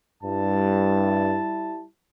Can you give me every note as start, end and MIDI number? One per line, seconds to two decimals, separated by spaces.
0.23 1.37 43
0.23 1.84 55
0.23 1.84 64
0.23 1.84 81